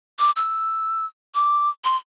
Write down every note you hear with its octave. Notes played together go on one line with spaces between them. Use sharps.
D6
E6
D6
C6